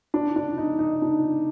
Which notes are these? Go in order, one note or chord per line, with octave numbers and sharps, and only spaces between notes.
D4
D4
D#4
D#4
D4